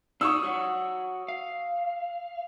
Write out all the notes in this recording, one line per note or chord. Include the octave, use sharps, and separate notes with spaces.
D4 D#4 F#4 C#6 D#6 E6
F#4 C#5 F#5
F5